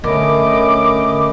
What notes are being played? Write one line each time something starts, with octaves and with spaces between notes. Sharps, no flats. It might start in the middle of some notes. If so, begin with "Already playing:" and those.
D3 A3 C#4 A#4 D#5 B5 D6